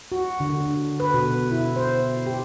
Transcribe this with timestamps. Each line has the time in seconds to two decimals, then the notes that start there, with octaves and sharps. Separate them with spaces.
0.12 F#4
0.40 D3
0.60 D3
1.00 B4
1.14 B2
1.51 E4
1.76 C5
2.26 G4